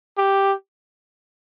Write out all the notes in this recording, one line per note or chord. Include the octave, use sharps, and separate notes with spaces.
G4